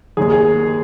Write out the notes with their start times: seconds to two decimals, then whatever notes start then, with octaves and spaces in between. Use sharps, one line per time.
0.17 D#2 D#3 G#4
0.32 G#4